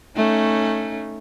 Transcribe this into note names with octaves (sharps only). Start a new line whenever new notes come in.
A3 C#4 D#4